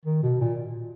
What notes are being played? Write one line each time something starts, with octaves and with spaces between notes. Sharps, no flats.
D#3
B2
A#2